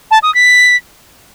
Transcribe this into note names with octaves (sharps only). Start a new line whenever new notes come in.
A5
D#6
B6